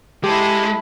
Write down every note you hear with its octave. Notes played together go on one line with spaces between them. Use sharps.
G#3 E4 G4 A4